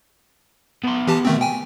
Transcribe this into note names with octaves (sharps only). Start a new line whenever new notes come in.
B2 C6
E3 G4 A5
D#3 A3 C4
G5 G#5